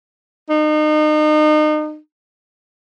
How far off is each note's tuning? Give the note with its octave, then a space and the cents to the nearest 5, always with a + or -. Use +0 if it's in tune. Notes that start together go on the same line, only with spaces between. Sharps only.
D#4 -35